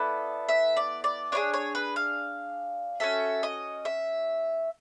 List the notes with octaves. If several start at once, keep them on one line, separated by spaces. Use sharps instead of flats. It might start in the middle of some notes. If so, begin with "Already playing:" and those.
Already playing: B3 E4 A4 D5
E5
D5
D5
D4 F4 G#4 C#5
C#5
B4
F5
C#4 F#4 A4 E5
D#5
E5